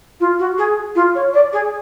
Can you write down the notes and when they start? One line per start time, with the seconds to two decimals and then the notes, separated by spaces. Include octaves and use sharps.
0.20 F4
0.39 F#4
0.58 G#4
0.95 F4
1.15 C#5
1.33 D5
1.53 G#4